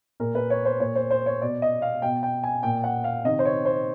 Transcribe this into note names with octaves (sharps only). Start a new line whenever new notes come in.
A#2 A#4
B4
C#5
C5
A#2 C#5
C5
C5
C#5
B2 D5
D#5
F5
B2 G5
G5
G#5
A#2 G5
F#5
F5
C3 D#3 D#5
C5
C#5
C5